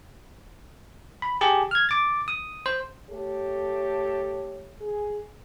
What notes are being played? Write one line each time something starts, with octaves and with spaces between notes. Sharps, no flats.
B5
G4 G#4 A5
F6 G#6
D6 A6
D#6
C5
A3 G4 A4 C#5
G#4